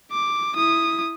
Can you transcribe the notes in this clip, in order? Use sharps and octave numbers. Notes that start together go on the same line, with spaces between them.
D6
E4 D#6